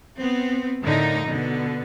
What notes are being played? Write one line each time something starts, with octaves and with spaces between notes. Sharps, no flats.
B3 C4
A2 D3 D#4 A#4
B2 D3 B3